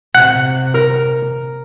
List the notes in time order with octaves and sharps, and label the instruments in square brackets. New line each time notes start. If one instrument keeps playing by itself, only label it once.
[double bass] C3 [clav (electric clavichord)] F#5
[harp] A#4